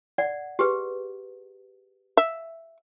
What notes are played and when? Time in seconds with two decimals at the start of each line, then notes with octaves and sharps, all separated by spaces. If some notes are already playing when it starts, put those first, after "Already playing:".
0.18 D5 F#5
0.59 G4 G#4 B4
2.17 E5